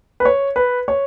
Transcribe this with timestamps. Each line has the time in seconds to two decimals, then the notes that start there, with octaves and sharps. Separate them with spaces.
0.20 B4
0.25 C#5
0.56 B4
0.88 C#5